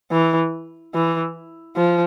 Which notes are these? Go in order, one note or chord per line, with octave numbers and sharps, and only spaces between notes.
E3
E3
F3